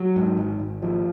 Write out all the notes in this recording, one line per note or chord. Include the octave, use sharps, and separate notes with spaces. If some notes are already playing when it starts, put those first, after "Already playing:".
Already playing: F#3
G#2
G#1
G#1
F3